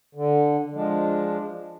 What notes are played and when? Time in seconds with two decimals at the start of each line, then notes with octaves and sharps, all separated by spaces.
0.15 D3
0.75 F3 G#3 D4